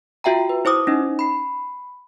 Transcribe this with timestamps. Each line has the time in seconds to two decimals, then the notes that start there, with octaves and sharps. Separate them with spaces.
0.24 F4 F#4 E5 G5 A#5
0.50 B4
0.65 E4 C5 D6 D#6
0.87 C#4 D#4 D#5
1.19 B5 C7